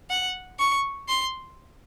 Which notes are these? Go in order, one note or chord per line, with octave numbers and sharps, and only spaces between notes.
F#5
C#6
C6